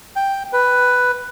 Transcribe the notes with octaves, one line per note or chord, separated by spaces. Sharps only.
G5
B4